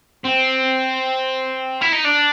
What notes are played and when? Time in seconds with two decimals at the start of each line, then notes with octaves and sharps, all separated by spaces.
0.25 C4
1.82 E4
1.93 D#4
2.05 D4